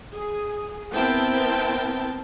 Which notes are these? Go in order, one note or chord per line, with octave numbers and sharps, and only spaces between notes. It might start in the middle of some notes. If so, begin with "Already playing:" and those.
G#4
B3 C4 E4 A#4 G5 A5